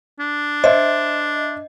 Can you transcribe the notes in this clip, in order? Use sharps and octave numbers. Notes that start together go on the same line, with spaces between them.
D4
C5 D#5 E5